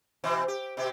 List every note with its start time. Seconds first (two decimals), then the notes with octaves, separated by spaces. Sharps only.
0.24 B2 E3 C4
0.48 G4
0.77 B2 G4